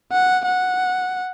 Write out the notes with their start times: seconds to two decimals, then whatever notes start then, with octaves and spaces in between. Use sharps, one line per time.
0.12 F#5
0.45 F#5